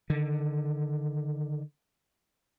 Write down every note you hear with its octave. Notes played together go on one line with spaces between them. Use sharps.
D3 D#3